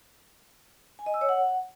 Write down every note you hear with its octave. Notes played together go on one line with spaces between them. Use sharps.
G#5
D#5
E6
C#5
F#5